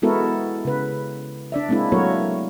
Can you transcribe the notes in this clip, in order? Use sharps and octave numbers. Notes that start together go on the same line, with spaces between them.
G#3 B3 E4 F#4 A4 A#4
C#3 B4
D4 D5 E5
G#3 A#3 C4 D4 E4
F#3 A3 A#3 F#4 A#4 C#5